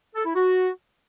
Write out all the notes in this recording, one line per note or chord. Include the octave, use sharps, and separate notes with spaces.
A4
E4
F#4